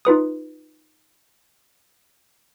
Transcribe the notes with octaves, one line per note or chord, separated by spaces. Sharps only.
D#4 F4 B4 D#6